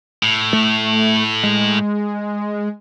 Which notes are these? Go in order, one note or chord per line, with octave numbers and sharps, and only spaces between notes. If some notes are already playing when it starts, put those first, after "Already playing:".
A2
A3
G#3